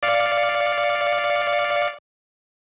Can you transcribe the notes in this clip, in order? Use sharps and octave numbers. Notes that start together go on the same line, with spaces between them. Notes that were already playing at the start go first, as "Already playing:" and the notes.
D5 F5 C#7